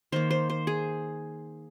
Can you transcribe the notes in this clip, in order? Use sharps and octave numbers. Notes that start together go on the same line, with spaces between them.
D#3 A#3 C5
C5
C5
G#4